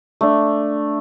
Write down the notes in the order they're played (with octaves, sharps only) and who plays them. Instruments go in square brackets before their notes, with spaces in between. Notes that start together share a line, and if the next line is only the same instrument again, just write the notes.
[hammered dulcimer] A3 D4